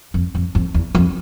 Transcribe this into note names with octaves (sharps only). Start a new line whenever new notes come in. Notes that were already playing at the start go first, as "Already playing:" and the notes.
F2
F2
F2
E2
F2